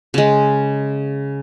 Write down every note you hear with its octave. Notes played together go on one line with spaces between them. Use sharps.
C#3 G#3